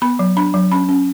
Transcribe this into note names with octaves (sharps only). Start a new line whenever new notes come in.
B3 B5
F#3
D4 B5
F#3
C#4 B5
C#4